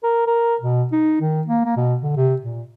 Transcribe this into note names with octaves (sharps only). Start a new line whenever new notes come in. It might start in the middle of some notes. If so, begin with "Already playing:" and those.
A#4
A#4
B2
D#4
D#3
A#3
A#3
B2
D3
C3
A#2